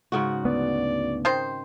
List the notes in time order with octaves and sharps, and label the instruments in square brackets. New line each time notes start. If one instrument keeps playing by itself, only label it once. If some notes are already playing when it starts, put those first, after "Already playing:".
[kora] G#2 C#3 F#4
[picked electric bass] D2 B3 [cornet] D5
[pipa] D#3 C4 C5